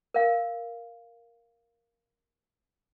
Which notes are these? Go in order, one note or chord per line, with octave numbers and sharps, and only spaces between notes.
A#4 F5